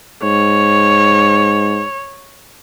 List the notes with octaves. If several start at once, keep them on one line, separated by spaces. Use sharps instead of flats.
G#2 C#5